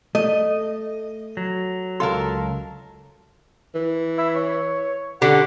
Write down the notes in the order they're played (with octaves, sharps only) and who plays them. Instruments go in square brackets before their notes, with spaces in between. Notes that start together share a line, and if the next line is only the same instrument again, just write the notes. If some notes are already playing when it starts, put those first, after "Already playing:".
[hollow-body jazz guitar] A3 [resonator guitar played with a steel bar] D#5
[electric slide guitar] F#3
[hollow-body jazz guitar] C#2 F5 C6 [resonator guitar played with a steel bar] A4 A#4
[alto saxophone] E3
[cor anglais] E5
C#5
[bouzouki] D3 [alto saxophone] G4 [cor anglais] F#5